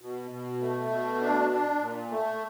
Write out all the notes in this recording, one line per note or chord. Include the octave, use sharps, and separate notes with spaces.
B2
B2
A3
B2
D4
D4
A#2
A3